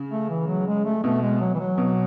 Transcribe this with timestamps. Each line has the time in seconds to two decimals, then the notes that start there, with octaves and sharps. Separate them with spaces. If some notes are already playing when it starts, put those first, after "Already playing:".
Already playing: C#3
0.11 A3
0.29 E3
0.47 F#3
0.67 G#3
0.85 A3
1.04 B2 A3
1.22 G#3
1.40 F#3
1.54 E3
1.60 F#3
1.78 B2